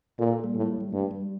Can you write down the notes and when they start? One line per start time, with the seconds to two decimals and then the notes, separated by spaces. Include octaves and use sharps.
0.19 A#2 F4 A4
0.31 F4 A4
0.44 G3 A#3
0.55 A2
0.81 G3
0.93 G2 A3
1.11 G3